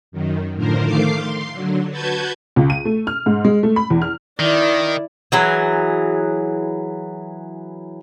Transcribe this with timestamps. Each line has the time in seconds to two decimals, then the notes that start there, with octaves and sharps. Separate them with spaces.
0.12 F#2 D#3
0.55 A2 D3 F3 A#4 C5
0.84 D#3 A3 F5 D6 C7
1.17 C6
1.53 D3 F#3
1.90 F#4 B4 A5 G6 G#6
2.56 C#2
2.70 D#7
2.85 A3
3.07 F6
3.26 G#2
3.45 G#3
3.63 A3
3.76 B5
3.90 E2
4.02 F6
4.40 D#3 E4 D5
5.32 E3 F#3 G#4